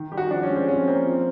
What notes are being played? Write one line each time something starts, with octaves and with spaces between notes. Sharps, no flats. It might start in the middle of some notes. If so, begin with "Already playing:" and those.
Already playing: D#3
G3 G4
F#4
F3 D4
C#4
G#3
C4
F3 C#4
A#3 C4
F3